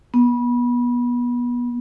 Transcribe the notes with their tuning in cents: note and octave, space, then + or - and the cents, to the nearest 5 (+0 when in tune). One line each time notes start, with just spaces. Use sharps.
B3 -25